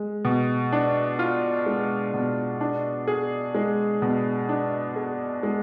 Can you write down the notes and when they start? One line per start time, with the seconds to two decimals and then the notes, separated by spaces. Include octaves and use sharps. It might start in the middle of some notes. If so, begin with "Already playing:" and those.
Already playing: G#3
0.25 B2
0.72 D4
1.19 F4
1.66 G#3
2.14 B2
2.61 D4
3.08 G#4
3.55 G#3
4.02 B2
4.49 D4
4.96 G#4
5.43 G#3